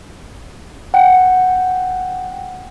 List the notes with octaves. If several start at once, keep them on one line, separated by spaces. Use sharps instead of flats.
F#5 G5